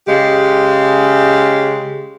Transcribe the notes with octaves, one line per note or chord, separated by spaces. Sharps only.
C#3 G#3 G4